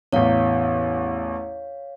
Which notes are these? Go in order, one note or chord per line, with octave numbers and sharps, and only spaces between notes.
A1 E2 C#5 F5